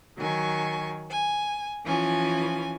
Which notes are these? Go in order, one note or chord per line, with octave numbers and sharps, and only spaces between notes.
D#3 F#3 G#5 C#6
G#5
E3 F3 C#4 G#5